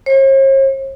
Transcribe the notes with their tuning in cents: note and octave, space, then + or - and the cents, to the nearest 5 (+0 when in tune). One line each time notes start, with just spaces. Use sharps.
C#5 -45